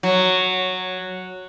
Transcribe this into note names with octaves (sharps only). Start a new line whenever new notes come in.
F#3